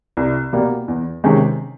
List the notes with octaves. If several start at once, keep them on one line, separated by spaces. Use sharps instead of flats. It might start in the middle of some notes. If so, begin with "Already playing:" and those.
C2
B2 G3 A#3
E2
C3 D#3 G#3 C#4